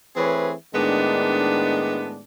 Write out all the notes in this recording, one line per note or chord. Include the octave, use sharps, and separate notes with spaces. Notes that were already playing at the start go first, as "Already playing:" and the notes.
E3 A3 C4 G#4 B4 C#5
A2 D#3 G#3 B3 D4